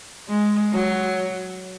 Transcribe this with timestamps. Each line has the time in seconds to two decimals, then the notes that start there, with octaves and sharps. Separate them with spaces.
0.28 G#3
0.72 F#3